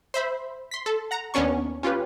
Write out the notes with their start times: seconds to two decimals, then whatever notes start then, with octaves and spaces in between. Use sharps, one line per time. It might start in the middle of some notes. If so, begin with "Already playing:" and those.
0.14 C5 E5 B5
0.71 C6 B6
0.86 A4
1.11 F#5 A#5
1.34 D#2 B3 C#4 D4 C#6
1.83 C#4 F4 G4 B4